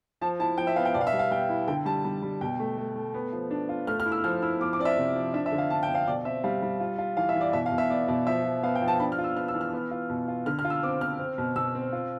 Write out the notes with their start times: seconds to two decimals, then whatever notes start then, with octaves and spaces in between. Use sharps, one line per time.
0.21 F3 A5
0.39 E4 A5
0.58 F3 G5
0.67 E5
0.76 B3 F5
0.85 G5
0.94 B2 D5
1.01 F5
1.07 E5
1.13 G3
1.19 F5
1.31 G3 G5
1.50 E4
1.68 D3 G5
1.86 G3 A5
2.05 G3
2.22 G3
2.41 B2 G5
2.60 A3
2.78 A3
2.96 A3
3.14 B3
3.33 F3
3.51 D4
3.69 F4
3.87 A3 F6
4.00 F6
4.06 E4
4.12 E6
4.24 F3 F6
4.42 E4 E6
4.60 F3 D6
4.73 D6
4.79 C4 D5
4.85 E5
4.97 C3
5.16 F3
5.34 D4 E5
5.46 E5
5.52 D3
5.58 F5
5.70 D4 A5
5.83 G5
5.89 F3
5.95 F5
6.07 B2 D5
6.25 C4 E5
6.44 G3 F5
6.62 G3
6.80 F4
6.98 F4
7.17 E3 F5
7.29 E5
7.35 E3
7.41 D5
7.53 B2 E5
7.66 F5
7.72 B2
7.78 E5
7.90 B3 D5
8.08 B2 D5
8.27 F3 E5
8.45 F3
8.63 B3 F5
8.75 G5
8.82 F3
8.88 A5
9.00 D4 B5
9.12 F6
9.18 F4
9.24 E6
9.37 B3 F6
9.48 E6
9.55 E3
9.61 F6
9.73 B3
9.91 F4
10.10 B2
10.28 F4
10.46 D3 F6
10.59 F6
10.65 F4
10.70 E6
10.83 C4 D6
11.01 C4 F6
11.19 C4
11.38 B2
11.56 B2 E6
11.75 C4
11.93 F4